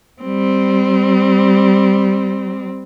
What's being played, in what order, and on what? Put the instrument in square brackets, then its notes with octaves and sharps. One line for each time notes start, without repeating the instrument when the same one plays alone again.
[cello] G3 C4